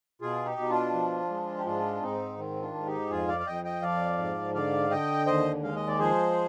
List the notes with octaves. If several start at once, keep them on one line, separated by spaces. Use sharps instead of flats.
B2 F4 G#4
D#4 G4
B2
D4 F4
F3
G#3
G4
G#2 D4 F4
G#2 C4 D#4
D#3 C4
D4 F4
G#2
D#4 G4
F2 F4 G#4
D5 F5
F5
F2 D#5 G5
D#5 G5
F3 D5 F5
G#2
D3 D5 F5
D3 D#5 G5
D#2 C5 D#5
G#3 F5
D#5
D5
F3 G#4 C5